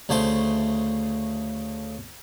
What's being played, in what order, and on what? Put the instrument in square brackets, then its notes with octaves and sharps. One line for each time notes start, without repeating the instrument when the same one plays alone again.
[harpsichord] D2 C#3 A3 C5 C6